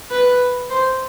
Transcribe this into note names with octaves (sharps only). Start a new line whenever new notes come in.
B4
C5